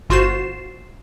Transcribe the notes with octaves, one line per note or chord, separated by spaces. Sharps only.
G1 F4 F#4 C5 C7 E7